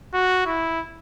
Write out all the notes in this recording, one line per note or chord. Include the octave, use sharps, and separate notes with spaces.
F#4
E4